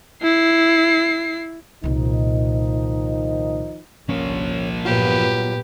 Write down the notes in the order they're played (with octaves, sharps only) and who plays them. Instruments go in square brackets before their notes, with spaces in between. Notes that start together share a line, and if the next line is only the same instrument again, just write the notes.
[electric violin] E4 C7
[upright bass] C2 A#2 [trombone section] D#3 F3 D#4
[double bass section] G1 C2 [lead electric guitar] F3 A#3 [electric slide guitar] C#4 A#4 C#5
[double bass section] G2 A#2 B3 [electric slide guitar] F#3 F4 [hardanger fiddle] G4 B4